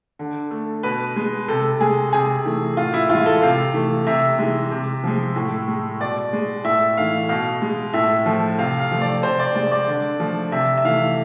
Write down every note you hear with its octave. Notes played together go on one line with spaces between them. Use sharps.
D3
A3
B2 B4
G#3
C3 A4
G#3 G#4
C3 G#4
E3 A3
A2 F4
E4
E3 G#3 F4
A4
C3 F5
E3 A3
C3 E5
E3 G#3
C3
F3 G#3
A2
G#3
B2 D5
G#3
A2 E5
E3 A3 F5
B2 F5
G#3
A2 E5
F3 A3
C3 F5
F5
F3 A3
D5
C3 C5
D5
G#3 D5
D5
D3
F3 A3
C3 E5
E5
E3 A3 F5